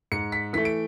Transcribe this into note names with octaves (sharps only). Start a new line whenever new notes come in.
G#2 C#7
B6
E3 A3 B6
D7